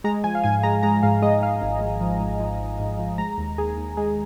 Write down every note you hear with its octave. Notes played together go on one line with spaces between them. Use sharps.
G#3 A#5
F3 G#5
F5
G#2 G#5
G#3 A#5
G#3 A#5
G#2 F5
G#3 D#5
G#3 F5
G#1
G#3
F3
G#2
F3
G#1
G#2
F3
G#3 A#5
D#2
D#2 G#4
D#2
G#3 G#4